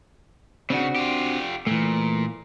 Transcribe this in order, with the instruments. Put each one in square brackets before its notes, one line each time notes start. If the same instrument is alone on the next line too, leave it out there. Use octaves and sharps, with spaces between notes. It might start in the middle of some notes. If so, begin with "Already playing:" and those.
[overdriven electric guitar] C#3 [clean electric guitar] C4 D4 F#4
[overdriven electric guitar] F4 G4
[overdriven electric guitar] A#2 [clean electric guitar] E3 A3